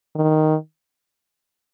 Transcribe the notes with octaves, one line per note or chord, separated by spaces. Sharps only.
D#3